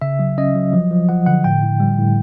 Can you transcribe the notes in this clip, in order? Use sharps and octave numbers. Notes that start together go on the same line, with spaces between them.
C#3 E5
F#3
C#4 D#5
F#3
F3
F3
F3 F#5
D3 F#5
A2 G5
A2
G3
A2